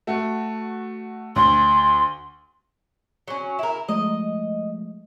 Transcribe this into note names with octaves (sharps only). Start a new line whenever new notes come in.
A3 F#4
D2 C6
F#3 C#4
E4 A#4 E7
F3 G#3 A3 D#5